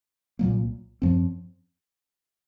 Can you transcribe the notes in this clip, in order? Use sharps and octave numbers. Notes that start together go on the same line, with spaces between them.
C2 A#2 F#3 A#3
F#2 F3 C4